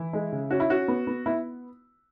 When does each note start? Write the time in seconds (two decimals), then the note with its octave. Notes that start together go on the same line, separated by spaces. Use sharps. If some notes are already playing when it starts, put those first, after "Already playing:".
Already playing: E3 E4
0.13 G#3
0.32 C#3
0.51 C#4 F#4
0.60 E4
0.70 C#4 F#4
0.88 B3
1.07 B3
1.26 B3 E4